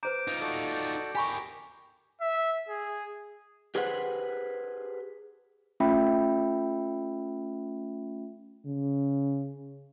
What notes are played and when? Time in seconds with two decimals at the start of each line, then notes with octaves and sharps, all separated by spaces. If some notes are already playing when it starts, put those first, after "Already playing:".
0.03 B4 C5 A#5 D6 G6 D7
0.27 D#4 F4
0.41 F#4 A4 D5
1.15 G4 A#4 G#5 B5 C#6
2.21 E5
2.69 G#4
3.75 G4 G#4 B4 C5 F#5
5.80 A3 C#4 F4 E5 G5 B5
8.66 C#3